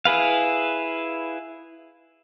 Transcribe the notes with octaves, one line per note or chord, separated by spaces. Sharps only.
E4 G#4 B4 F5